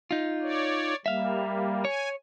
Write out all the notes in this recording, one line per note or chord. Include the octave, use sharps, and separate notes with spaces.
D#4 F4
C#5 D5
G3 A#3 E5 F5
C#5 G#5